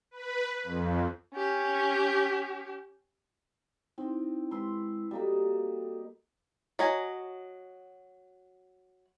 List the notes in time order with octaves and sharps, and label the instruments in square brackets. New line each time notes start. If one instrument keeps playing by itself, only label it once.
[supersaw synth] B4
F2
[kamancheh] C#4 G4
[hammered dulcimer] C4 [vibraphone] D#4 E4
[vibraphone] G#3 E4 E6 [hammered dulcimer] B4 C6
[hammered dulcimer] G3 A#3 D#4 [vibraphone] F#4 A4
[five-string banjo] F#3 D#5 G#5